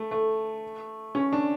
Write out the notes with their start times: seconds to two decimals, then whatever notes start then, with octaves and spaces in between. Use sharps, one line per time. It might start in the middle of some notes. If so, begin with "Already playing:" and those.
Already playing: A3
0.11 A3
1.15 C#4
1.33 D4